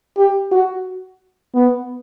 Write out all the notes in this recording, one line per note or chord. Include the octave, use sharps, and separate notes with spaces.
G4
F#4
B3